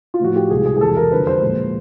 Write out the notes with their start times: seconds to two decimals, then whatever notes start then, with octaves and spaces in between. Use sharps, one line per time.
0.14 F4
0.20 A2 F3 A3 F#4
0.36 G4
0.50 C2 B2 G#3 G#4
0.66 G#4
0.77 G#4
0.81 E2 B2 G#3 A4
0.97 A#4
1.12 F2 D3 F#3 B4
1.27 C5
1.42 A#2 F3 G#3